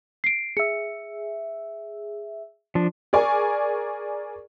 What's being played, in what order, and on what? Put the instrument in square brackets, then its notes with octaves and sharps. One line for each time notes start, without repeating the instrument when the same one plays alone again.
[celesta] C7 D7
[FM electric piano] G#4 E5 [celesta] C#7
[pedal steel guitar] F3 D4
[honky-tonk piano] G#4 A#4 D5 G#5 C#6